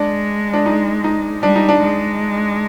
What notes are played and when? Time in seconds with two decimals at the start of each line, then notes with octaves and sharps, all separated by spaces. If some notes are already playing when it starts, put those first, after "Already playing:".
Already playing: G#3 D4
0.53 D4
0.66 D#4
1.04 D#4
1.43 G3 D4
1.56 D#4
1.69 D4
1.81 G#3